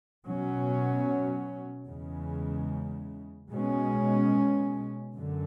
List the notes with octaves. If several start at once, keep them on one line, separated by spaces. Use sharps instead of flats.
B2 F#3 C#4
E2 C#3 G#3
B2 G#3 C#4
F#2 D3